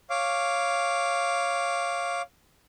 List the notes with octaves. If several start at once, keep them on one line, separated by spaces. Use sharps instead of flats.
C#5 F5 D6